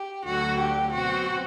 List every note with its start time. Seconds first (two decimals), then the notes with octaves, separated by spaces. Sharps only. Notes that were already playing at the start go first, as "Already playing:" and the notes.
Already playing: G4
0.25 D2 D3 F#3 F#4
0.59 G4
0.93 B2 F#3 C4 F#4